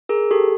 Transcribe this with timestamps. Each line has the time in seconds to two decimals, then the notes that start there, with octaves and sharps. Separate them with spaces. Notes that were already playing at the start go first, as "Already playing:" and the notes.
0.09 G#4 A#4
0.31 G4 A4